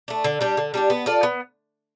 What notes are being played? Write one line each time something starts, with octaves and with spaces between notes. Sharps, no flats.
A3 D4
D3
G3 D4 G4
D3
G3 D4 G4
B3
F4 A4 D5
B3